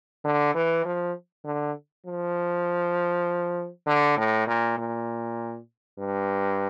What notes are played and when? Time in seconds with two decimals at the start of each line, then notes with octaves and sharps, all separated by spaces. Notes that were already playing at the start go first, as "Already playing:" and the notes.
0.25 D3
0.55 E3
0.85 F3
1.45 D3
2.06 F3
3.87 D3
4.17 A2
4.47 A#2
4.78 A#2
5.98 G2